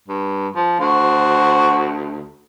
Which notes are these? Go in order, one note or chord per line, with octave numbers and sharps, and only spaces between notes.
G2
F3
D2 F#4 C5